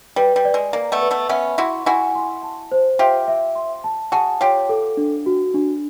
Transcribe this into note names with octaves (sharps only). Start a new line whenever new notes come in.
G3 B4
G3
D5
G#3
A#3 D5
A3 B3
B4
A3 B3
B3 C#4 E5
E4 F#4 C6
E4 F#4 G#5
C6
A5
C5
F4 G4 E5
E5
C6
A5
F#4 G#4 A5
F4 G4 C#5
A4
D4
F#4
D4